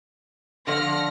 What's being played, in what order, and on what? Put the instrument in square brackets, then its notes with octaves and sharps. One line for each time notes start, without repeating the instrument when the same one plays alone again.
[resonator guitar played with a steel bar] D3 F3 D5 [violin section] F6 A#6 C#7